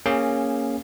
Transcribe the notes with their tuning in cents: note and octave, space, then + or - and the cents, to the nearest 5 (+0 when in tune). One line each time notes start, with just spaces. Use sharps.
A#3 +0 C#4 +0 G#4 -15